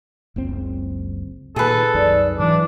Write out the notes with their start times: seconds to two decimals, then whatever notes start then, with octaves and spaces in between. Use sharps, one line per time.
0.36 F#1 C#2 C4
1.56 A#2 D#3 G#4 A4 B4
1.95 C2 F#2 D#3 D5
2.39 G#2 E3 F#3 D4